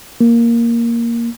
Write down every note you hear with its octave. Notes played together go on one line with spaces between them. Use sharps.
A#3